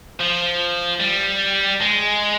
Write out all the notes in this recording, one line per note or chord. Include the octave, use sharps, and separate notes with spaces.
F3
G3
G#3